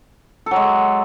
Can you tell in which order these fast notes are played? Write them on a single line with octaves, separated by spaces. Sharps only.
A4 F#3 G#3